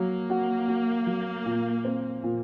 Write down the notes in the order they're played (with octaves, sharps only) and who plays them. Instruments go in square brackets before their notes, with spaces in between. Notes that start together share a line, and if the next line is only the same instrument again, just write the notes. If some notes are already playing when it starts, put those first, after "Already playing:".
Already playing: [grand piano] F#3 [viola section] A#3
[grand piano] F#4
F#4
F#3
A#2
C4
A#2